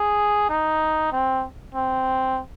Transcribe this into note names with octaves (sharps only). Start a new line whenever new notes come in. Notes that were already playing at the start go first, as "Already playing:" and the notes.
Already playing: G#4
D#4
C4
C4